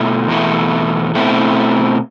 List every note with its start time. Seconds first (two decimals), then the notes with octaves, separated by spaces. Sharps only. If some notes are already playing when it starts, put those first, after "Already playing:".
Already playing: B2 A3 E4
0.28 E2 B2 A3 E4
1.15 B2 A3 C4 E4